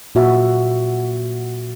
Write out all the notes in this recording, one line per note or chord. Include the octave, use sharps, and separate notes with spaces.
A#2 F#4 E5